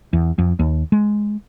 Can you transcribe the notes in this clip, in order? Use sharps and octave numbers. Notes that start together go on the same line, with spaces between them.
E2
F2
D#2
G#3